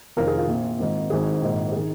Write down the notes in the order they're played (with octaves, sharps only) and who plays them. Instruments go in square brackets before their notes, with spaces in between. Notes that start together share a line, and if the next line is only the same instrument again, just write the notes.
[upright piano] F1 F2 D#3 F4 A#4
G#4
F4
A#1 A#2
G#1 G#2 D#3
G#1 G#2 D#3 G#4
A#1 G#2 D#3
D#3 G#4